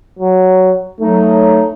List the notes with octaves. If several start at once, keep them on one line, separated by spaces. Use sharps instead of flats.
F#3
F#3 A3 D#4